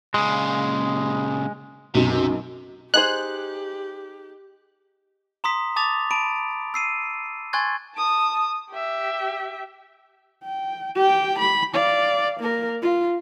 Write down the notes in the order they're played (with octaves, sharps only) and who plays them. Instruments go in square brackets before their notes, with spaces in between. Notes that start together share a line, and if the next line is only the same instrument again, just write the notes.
[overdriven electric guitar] A#2 C#3 [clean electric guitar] G#3
[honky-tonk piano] B1 F#2 [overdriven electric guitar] C3
[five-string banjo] D#4 G#4 C5 [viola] G4 [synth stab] F#6
[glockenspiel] A#5 C6 D#6 B6
A5 D6 D#6 A6 F7
A5 B5 D7
E6 C7 D#7
G#5 C6 C#6 F#6 G#6 A6
[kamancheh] A5 D#6
G4 E5
[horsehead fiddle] G5
G4 G5
B5
D5 F5
A#3 A#4
F4